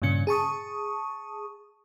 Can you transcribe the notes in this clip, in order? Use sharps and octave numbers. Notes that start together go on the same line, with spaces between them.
G2 A#2 C#3 C#4 C#7
G#4 A5 C#6 D#6